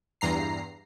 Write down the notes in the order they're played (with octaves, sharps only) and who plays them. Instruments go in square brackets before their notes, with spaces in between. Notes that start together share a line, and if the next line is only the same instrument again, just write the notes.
[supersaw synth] E2 G2 A#5 C7